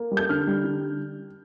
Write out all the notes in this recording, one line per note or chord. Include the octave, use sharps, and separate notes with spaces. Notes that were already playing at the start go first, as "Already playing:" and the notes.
Already playing: A#3
G3
G6
D3 F6
G3
D3